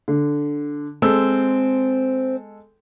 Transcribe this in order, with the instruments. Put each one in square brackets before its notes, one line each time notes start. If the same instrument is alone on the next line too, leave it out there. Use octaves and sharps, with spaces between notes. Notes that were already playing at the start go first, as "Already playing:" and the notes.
[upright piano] D3
[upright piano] G#3 A4 E6 [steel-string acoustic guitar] C4